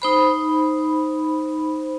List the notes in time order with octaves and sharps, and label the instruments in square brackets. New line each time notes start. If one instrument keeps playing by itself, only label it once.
[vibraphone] D#4 C5 B5